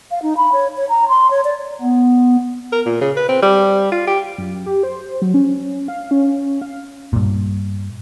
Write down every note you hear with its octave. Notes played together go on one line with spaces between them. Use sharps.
F5
D#4
B5
C#5
C#5
A#5
C6
C#5
D5
B3
A#4
A#2
C#3
B4
C4
G3
F4
G4
F#2
G4
C5
F#3
C#4
F5
C#4
F5
G2 A#2